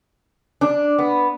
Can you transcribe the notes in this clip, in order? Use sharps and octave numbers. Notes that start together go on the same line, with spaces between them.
D4
B3